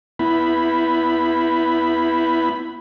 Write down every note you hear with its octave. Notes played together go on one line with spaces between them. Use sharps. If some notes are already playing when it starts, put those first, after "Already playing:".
B3 E4 B5